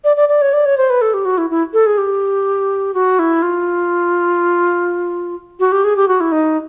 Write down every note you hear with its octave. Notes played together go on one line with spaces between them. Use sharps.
D5
D5
D5
C#5
D5
C#5
C5
B4
A4
G4
F#4
E4
E4
A4
G#4
G4
F#4
E4
F4
F#4
G4
G#4
G4
F#4
E4
D#4